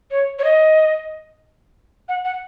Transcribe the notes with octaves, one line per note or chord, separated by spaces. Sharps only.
C#5
C#5
D#5
F#5
F#5